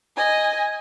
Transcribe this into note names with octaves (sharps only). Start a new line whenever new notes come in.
D#5 G#5